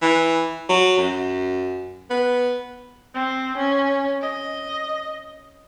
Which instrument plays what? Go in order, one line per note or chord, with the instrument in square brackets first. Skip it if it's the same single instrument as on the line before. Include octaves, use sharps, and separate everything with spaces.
[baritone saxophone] E3
F#3
F#2
B3
[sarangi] C4
C#4
D#5